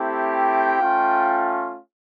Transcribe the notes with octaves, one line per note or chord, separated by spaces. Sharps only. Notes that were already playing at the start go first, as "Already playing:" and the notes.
Already playing: A3 C4 E4 G4
G5
A3 C#4 F4